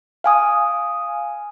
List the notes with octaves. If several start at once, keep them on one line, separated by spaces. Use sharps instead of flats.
F5 G#5 D#6